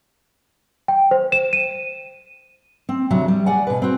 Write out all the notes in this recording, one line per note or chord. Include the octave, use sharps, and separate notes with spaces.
G5
C5
E7
D#7
C4
D2 C3 F#3 E5
G3
D5 F#5 G#5
B2 B4
C4 F#4